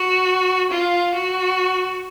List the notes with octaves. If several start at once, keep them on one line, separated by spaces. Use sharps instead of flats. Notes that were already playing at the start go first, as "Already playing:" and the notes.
Already playing: F#4
F4
F#4